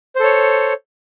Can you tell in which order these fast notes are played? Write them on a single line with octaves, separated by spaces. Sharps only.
C5 A4 C#5